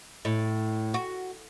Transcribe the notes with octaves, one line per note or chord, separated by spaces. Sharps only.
A2
F#4